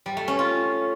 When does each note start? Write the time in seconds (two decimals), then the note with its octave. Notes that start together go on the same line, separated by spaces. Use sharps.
0.06 G3
0.17 A3
0.28 C#4
0.39 F4